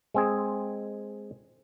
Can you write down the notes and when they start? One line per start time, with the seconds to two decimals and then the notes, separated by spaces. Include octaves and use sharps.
0.14 G#3 C4 G#4